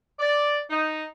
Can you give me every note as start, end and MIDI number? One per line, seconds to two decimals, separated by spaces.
0.19 0.58 74
0.70 1.04 63